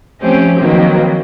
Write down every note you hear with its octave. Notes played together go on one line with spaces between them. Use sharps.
F3 A3 C4 C#4 G4 C5
D#3 F3 F#3 A#3 C4 B4